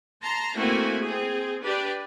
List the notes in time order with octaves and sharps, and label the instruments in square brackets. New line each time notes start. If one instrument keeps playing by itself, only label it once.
[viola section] A5 A#5 C6
A3 A#3 C4 E4 F#4 G#5
C4 G#4
D4 G4 B4 D5